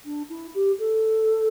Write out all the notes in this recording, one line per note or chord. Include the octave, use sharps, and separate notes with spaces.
D4
E4
G4
A4